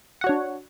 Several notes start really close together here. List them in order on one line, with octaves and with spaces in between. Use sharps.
F#5 F#4 C#5 D4